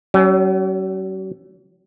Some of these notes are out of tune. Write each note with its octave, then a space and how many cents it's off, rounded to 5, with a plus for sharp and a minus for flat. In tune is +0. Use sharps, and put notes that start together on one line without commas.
F#3 +40 C#4 +0